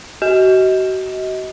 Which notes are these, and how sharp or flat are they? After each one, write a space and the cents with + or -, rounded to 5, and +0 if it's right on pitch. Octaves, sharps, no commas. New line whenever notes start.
F#4 +35 D#5 +30